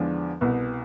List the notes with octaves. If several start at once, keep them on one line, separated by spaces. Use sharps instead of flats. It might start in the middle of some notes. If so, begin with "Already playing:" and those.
Already playing: E2 D3 F3 G#3 D4
C2 B2 B3